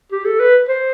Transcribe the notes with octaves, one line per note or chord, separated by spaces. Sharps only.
G4
A4
B4
C5